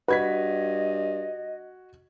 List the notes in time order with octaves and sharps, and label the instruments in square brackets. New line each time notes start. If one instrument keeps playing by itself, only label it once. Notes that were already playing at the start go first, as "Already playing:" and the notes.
[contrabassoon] G2 [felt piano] F#4 G#6 B6 [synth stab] B4 [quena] D#5